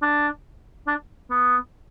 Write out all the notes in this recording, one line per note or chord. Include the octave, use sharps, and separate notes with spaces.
D4
D4
B3